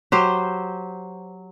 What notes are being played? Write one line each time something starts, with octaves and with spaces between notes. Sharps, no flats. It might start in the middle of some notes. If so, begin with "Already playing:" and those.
F#3 G4 C5